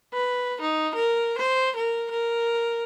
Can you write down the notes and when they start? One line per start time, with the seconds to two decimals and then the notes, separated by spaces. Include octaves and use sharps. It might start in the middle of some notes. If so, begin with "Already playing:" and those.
0.14 B4
0.61 D#4
0.95 A#4
1.38 C5
1.76 A#4
2.11 A#4